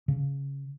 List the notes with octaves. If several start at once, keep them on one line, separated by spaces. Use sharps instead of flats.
C#3